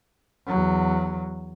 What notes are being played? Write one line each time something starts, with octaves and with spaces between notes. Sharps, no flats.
E2 F#3